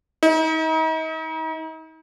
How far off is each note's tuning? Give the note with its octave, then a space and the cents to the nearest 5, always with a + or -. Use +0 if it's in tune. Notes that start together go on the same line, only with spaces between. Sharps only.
D#4 +40